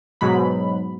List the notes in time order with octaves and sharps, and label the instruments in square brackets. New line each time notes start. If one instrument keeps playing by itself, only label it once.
[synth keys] G#2 B2 F#3 B5